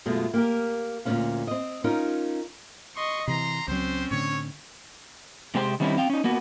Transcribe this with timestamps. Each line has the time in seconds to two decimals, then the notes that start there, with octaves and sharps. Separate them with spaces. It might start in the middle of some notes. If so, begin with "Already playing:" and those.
0.06 F#2 B2 G#3 A3 F4
0.34 A#3 G4 A#4
1.05 D2 A#2 D#3 A3 C#4 F5
1.47 C4 D#5
1.84 C#4 D#4 F4 A#4
2.96 D#5 C6 C#6
3.28 C3 E3 A#5 C6
3.68 C#2 F#3 C4 C#4 C5
4.11 A2 D3 C#5
5.55 C3 G#3 C4 G4 B4 C5
5.80 D#3 G3 C4 C#4 D#4 E4
5.97 C4 F5 G5
6.10 C#4 D#4
6.24 A#3 B3 F#4